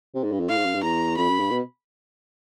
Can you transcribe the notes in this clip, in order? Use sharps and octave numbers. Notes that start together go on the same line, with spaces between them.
C3
G#2
G2
F2
A2 F5
G#2
F#2
G2
E2 A#5
F2 B5
F#2
G2
B2